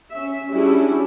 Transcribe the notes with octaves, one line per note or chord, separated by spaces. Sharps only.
C#4 E5
G3 C#4 D4 E4 F#4 G#4